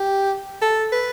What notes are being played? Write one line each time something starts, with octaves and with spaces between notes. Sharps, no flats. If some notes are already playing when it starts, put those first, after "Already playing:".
Already playing: G4
A4
B4